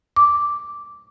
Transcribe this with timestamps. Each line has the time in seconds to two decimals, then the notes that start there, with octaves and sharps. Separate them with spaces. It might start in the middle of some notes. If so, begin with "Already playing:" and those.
0.16 D6